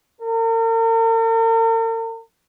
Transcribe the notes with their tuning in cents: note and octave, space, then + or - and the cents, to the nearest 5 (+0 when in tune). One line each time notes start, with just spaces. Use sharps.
A#4 -45